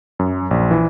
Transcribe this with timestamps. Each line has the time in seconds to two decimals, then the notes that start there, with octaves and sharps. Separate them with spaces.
0.19 F#2
0.51 A#1
0.71 E3